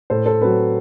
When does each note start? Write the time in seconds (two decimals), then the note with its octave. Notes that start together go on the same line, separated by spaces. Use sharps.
0.10 A2 A4 C5
0.26 A4 C5
0.41 F#3 C4 B4